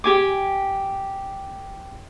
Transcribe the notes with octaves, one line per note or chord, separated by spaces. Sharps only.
G4 G#5 D6